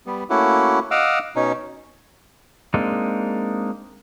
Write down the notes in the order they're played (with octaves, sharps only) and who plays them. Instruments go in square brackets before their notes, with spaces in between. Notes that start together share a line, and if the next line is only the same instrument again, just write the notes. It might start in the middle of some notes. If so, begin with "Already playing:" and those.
[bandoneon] G3 B3
A3 A#3 C#4 E4 F#4
D#5 F5 F#5 D6 E6
B2 C#4 D#4
[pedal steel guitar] G#3 A#3 C4 D4 D#4